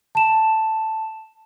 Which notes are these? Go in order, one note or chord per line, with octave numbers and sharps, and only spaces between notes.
A5 E7